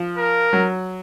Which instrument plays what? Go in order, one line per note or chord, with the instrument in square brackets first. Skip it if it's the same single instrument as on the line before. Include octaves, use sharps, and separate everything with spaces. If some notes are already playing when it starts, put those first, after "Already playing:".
Already playing: [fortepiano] F3
[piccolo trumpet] A#4
[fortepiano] F#3